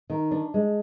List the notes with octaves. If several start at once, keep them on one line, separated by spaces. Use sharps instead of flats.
D#3
D4
G#3